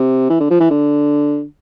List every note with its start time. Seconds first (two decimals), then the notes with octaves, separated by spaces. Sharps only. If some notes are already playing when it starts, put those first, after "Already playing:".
Already playing: C3
0.30 E3
0.40 D3
0.50 F3
0.60 E3
0.70 D3